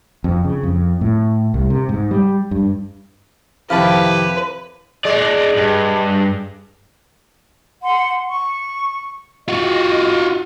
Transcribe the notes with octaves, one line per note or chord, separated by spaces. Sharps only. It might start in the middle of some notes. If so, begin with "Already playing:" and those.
F2
C#3
F2
A2
C2
C3
G#2
G3
G2
F2 C3 D#3 E4 G4 B4 F5 A5
G#3 D#4 D5
G2
F#5 C6
C#6
F4 F#4 D#5